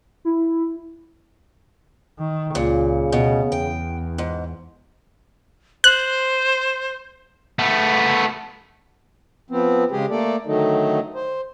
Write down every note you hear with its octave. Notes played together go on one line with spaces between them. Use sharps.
E4
D#3
C#2 A#2 C#3
D2 B2
E2 G5
G#2
C5 F#6
A3 B3
F3 B3 C4
C#3 G#3 G4 G#4
A3 A#3 A4 D5
D3 D#3 F#3 A3 D#4
C5